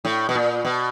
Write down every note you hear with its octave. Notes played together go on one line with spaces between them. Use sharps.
A2
B2
A#2
B2